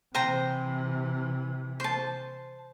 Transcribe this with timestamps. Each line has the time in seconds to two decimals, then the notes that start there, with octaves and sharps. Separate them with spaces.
0.15 C3 E3 C5 G5 A#5
1.80 C5 A5